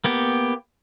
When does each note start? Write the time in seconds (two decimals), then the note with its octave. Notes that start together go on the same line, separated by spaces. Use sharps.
0.04 A#3 B3 G4